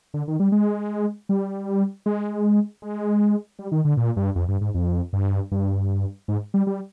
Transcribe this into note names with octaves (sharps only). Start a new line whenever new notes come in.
D3
D#3
G3
G#3
G3
G#3
G#3
G3
D#3
D3
A#2
G2
F2
G2
G#2
F2
G2
G2
G#2
G3
G3